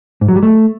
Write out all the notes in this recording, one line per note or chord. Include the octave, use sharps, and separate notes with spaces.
G#2
F#3
G3
A3